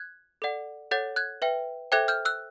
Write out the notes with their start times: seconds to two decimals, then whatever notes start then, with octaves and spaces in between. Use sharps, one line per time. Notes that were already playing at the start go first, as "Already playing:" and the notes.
Already playing: F#6 G#6
0.42 A4 D5 F#5
0.91 A4 C#5 F#5 G6 A6
1.16 F#6 G#6
1.42 B4 E5 G5
1.92 A4 C5 E5 G5 F#6 G#6
2.08 F6 G6
2.25 E6 F#6